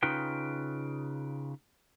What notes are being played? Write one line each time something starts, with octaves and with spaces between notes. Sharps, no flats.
C#3 D#4 F4 B4 G5